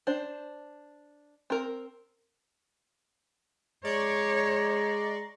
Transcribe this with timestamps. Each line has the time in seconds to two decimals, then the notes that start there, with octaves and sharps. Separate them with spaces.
0.07 D4 C5
1.50 C4 A#4
3.85 G#3 C#5 D5 A#5 C6 C#6